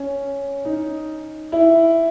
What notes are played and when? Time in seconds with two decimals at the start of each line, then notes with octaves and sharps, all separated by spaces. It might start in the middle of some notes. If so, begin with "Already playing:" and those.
Already playing: C#4
0.65 D#4
1.52 E4